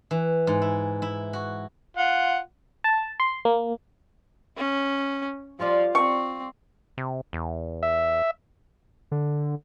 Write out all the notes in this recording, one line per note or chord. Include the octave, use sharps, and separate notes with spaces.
E3
G#2
E4
E4
F#4
F4 F#5
A5
C6
A#3
C#4
F3 G3 F4 D5
C4 C#6
C3
E2
E5
D3